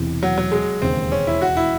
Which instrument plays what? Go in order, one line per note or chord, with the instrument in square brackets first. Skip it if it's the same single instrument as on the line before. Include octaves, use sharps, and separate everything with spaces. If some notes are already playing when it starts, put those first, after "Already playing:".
Already playing: [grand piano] E1 E2 C3 E3 C4
[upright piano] F#3
F#3
G#3
[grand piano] E1 D#2 C#3 G#3 [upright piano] C4
[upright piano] C#4
E4
F#4
E4